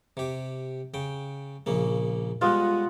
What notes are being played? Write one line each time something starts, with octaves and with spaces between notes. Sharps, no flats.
C3 G4
C#3 G5
A#1 C#3 A#3
B2 G3 G#3 F4 D#5 F#5